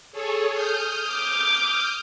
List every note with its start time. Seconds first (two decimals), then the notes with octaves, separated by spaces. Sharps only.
0.12 G#4 A4 C#5
0.51 D#6 F6 G6
1.12 D6